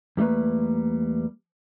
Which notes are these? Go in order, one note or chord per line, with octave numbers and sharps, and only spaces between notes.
E2 G3 A3 A#3 B4